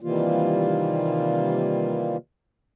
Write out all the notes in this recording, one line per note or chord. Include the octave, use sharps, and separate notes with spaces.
C3 D#3 E3 G3 A#3 F4